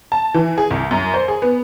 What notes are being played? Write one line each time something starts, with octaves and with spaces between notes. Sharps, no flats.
A5
E3
G#4
C2
F#2
C5
G#4
B3